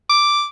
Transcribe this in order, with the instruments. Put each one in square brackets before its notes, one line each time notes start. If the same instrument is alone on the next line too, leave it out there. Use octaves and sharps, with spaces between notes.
[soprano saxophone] D6